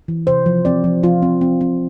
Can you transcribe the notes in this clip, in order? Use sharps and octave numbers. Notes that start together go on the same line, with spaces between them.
E3
C3 C5
F3
C4 D5
F3
F3 F4
C4
C4
C4